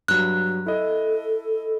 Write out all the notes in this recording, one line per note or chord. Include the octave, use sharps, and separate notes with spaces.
G2 F#3 F#6
E4 A4 D#5